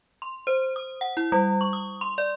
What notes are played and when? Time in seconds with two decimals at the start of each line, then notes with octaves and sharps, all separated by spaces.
0.22 C6
0.47 C5
0.76 D#6
1.01 F#5
1.17 E4
1.32 G3
1.61 C#6
1.73 D#6
2.01 C6
2.18 D5